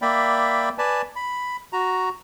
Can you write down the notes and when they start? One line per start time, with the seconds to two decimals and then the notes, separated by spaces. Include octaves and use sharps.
0.02 A#3 D5 E5 G5 B5
0.78 B4 D5 G#5 A5
1.16 B5
1.73 F#4 A#5